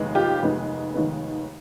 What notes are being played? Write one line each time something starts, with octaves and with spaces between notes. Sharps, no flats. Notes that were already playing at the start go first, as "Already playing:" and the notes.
Already playing: F1 D#2 D#3 G#3 B3
F4 G4
F1 D#2 D#3 G#3 B3
F1 D#2 D#3 G#3 B3